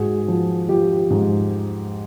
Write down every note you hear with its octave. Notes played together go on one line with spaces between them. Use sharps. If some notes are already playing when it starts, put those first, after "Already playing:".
Already playing: G#2 F#4 G#4
F3
F3 F4 G4
G#2